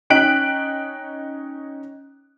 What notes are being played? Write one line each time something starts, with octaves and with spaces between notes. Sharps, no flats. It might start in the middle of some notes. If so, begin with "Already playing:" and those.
C#4 D#4 G5 F#6 B6 D7